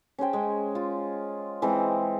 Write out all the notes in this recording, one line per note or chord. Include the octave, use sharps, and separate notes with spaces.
C#4 G#4 C5 G5
G#3
F4
E3 G#3 C4